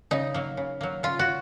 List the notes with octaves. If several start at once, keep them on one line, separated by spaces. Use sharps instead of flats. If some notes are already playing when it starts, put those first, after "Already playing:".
C#3 D#4
F#3 A#3
C#3
F#3 A#3
C#3 F4
F#4